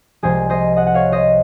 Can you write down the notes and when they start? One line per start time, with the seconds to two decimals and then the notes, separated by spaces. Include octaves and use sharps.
0.23 C2 C3 F3 G#3 G#4 C5
0.50 C5 D#5
0.76 D#5 F#5
0.86 F#5
0.94 C#5 F5
1.12 C5 D#5